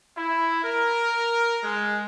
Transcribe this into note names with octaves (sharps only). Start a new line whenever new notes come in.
E4
A#4
G#3